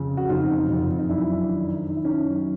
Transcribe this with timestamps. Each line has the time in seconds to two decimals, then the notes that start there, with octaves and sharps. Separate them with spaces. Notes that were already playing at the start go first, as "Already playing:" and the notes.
Already playing: F2 C#3
0.17 F#4
0.29 F2 D#4 F4
0.69 F2
0.98 D#4
1.09 F#2 D4 E4
1.49 D#3
1.89 D#3 D#4
1.97 E4
2.04 C#4 D#4
2.29 F#2